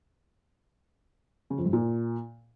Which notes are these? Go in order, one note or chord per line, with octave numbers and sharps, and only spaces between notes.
C#3
F2
G2
A#2